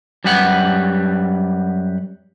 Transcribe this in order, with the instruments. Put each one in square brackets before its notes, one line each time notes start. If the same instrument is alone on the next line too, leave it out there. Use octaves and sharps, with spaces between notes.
[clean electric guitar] F#2 G3 G4 B4 F#5